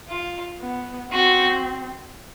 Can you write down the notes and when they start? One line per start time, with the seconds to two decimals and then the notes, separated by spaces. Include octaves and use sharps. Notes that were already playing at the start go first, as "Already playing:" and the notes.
0.09 F4
0.60 B3
1.12 C4 F#4